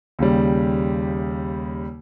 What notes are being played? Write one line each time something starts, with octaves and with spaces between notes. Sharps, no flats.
D#2 C#3 G3